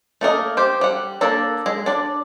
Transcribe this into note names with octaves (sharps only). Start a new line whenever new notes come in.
A3 A#3 A#4 D#5
G4 C5
G3 F#5
A#3 D4 A4 A#5
G#3
D4 D5